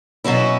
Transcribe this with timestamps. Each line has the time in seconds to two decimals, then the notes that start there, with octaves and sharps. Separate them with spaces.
0.24 B2 F#3 C#4 E4